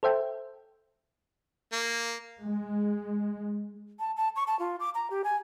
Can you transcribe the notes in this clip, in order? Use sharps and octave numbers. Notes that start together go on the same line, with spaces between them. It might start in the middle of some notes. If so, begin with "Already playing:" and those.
A4 C5 E5 G5
A#3
G#3
A5
A5
C#6
A5
F4
D6
A#5
G4
G#5